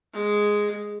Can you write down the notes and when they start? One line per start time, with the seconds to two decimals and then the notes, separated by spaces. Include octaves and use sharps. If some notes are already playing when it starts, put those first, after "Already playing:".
0.14 G#3